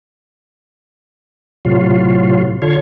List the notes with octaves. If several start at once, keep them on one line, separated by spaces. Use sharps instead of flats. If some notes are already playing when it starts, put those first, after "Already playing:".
A2 C3 F#3 F4
D3 F4 C#5